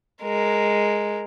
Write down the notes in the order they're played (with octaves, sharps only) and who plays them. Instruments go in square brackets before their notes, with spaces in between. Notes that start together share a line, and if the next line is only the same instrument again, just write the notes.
[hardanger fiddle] G#3 A#4